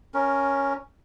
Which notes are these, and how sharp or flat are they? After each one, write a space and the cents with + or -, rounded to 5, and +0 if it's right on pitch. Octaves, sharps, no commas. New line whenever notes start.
C#4 +0 A#4 +0